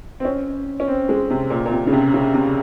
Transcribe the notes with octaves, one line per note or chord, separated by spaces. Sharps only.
C4
C#4
C#4
C4
G#3
C3
A#2
A#2
C3
C#3
C3
C#3
C3